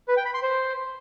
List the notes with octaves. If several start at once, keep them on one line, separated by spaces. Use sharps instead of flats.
B4
G5
B5
C6
C5